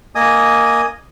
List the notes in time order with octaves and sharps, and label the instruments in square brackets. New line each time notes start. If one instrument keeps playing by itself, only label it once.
[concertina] A#3 D#5 G#5 D#6